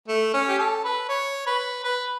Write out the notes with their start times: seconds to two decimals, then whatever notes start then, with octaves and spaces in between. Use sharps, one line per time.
0.08 A3
0.34 C#4
0.48 G4
0.58 A4
0.84 B4
1.09 C#5
1.47 B4
1.84 B4